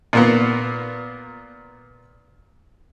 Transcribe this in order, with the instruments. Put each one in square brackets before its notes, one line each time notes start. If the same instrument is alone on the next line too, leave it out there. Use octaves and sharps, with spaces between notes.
[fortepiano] A#2 A#3 B3